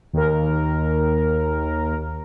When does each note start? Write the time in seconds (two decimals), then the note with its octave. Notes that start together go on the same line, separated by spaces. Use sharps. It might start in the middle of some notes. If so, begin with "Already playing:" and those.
0.13 D#2 A#4